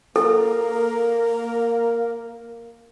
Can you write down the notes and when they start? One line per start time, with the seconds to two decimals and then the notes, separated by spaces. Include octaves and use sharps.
0.16 A#3 A4 A#4